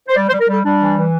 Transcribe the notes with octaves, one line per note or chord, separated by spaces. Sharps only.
C5
G3 D5
C5
G3
A#4
G3 A4
G3 D4
E3
E3